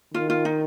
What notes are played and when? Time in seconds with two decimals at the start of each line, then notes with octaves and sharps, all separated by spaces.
0.14 D#3 F4
0.30 F4
0.45 D#4